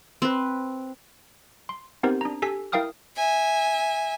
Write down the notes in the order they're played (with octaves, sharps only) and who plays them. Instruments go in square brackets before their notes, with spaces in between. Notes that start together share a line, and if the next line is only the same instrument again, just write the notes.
[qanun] C4 B4
[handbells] C6
B3 C4 D#4 G4 A#4 C5
D4 A#5
G4 A4 G#5 E6 B6
E4 A#4 F5 G5 D#6 F6
[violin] E5 G#5